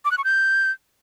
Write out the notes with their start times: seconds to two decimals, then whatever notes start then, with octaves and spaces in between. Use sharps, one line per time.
0.05 D6
0.11 F#6
0.18 C#6
0.24 G6